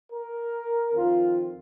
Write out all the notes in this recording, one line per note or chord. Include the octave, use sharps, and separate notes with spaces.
A#4
F2 D#3 C4 F4